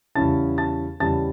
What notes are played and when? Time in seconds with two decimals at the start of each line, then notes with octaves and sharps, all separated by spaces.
0.15 E2 C#3 G3 C#4 E4 A5 A6
0.58 A5 A6
1.00 E2 C#3 G3 C#4 E4 A5 A6